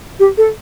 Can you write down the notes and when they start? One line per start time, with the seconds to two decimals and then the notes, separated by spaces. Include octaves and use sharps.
0.20 G4
0.38 A4